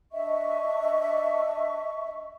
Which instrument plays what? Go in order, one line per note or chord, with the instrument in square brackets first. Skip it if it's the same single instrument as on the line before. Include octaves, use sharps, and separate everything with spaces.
[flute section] D4 D#5 E5 C#6